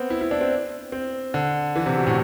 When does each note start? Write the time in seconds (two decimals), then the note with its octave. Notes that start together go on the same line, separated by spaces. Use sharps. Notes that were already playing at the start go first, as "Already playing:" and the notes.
Already playing: B3 C4
0.10 E4
0.21 E4
0.31 D4
0.41 C4
0.92 C4
1.34 D3
1.76 E3
1.86 C3
1.97 B2
2.07 A2